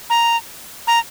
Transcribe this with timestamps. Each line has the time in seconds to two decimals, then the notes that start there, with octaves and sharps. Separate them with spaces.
0.10 A#5
0.87 A#5